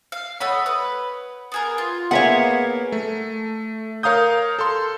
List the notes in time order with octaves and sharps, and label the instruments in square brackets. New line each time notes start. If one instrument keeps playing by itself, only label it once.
[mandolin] F5
[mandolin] A3 D#5 B5 [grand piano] C#5 F#5
[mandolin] B4
B3 G#4 A#4
F4
[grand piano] A#3 B3 G#4 [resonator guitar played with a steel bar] C#5 E5 F#5
[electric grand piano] A3
A#4 C#5 F5 A#5 D#6 G6
A4 C6